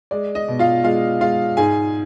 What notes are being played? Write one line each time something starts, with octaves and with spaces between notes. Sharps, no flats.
G#3 D5
D#5
B2
F4 F5
G#3 F4 F5
G#3 F4 F5
G#2 G#4 G#5